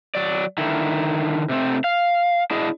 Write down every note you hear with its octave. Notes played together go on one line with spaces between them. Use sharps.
F#3 D5
D3 D#3 E4
C3 A3 C4
F5
D4 E4 G#4 D#5